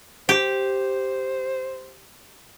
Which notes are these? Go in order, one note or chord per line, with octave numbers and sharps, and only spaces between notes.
G4 C5